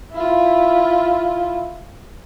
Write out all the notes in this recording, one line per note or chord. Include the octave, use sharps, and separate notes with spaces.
E4 F4